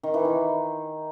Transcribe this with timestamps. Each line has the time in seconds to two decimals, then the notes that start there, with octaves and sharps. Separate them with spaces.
0.03 D#3
0.14 E3
0.25 D#3